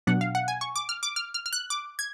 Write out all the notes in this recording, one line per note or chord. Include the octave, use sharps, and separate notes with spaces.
B2 F#3 B3 D4 F#5
F5
F#5
G#5
C#6
D6
F6
D6
F6
F6
F6
F#6
D6
G#6